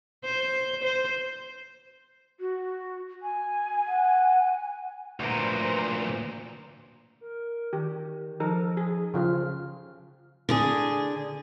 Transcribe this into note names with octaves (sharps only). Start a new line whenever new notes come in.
C5
C5
F#4
G#5
F#5
D2 A#2 B4 C5 A#5
A#4
D#3 G4
F3 D#4 A4 A#4
G#4
C#3 F3 F4 F6
D3 D4 G#4